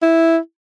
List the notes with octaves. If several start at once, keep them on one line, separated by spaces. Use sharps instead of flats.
E4